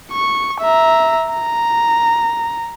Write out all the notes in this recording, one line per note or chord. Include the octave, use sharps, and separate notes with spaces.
C#6
E5 A#5
A#5